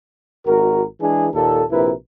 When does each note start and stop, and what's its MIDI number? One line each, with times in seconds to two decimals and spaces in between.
0.46 0.84 32
0.46 0.84 66
0.46 0.84 70
1.01 1.28 52
1.01 1.28 56
1.01 1.28 62
1.01 1.28 68
1.34 1.63 39
1.34 1.63 46
1.34 1.63 69
1.71 1.92 34
1.71 1.92 48
1.71 1.92 64
1.71 1.92 70
1.71 1.92 71